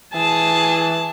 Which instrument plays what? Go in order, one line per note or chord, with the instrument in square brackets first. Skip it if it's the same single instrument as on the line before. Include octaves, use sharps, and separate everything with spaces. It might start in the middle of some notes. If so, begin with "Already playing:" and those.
[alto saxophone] E3 [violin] G#4 [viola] A5